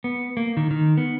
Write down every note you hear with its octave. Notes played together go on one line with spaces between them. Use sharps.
B3
A#3
D#3
D#3
B3